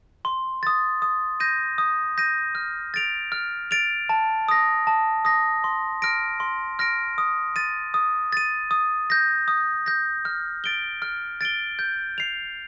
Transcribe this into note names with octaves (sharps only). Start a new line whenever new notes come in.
C6
D#6 A6
D#6
G6 A#6 D#7
D#6
G6 A#6 D#7
F6
A6 D7 F7
F6
A6 D7 F7
A5
D#6 A#6
A5
D#6 A#6
C6
F6 A#6 D7
C6
F6 A#6 D7
D#6
A6 D#7
D#6
A6 D#7
D#6
G6 A#6
D#6
G6 A#6
F6
A6 D7 G7
F6
A6 D7 G7
G6
C7 F7